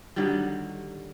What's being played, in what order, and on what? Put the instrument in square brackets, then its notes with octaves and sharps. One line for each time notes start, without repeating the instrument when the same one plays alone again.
[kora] D3 D#3 F#3 G3